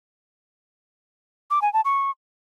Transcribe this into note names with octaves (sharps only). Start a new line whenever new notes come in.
D6
G#5
A5
C#6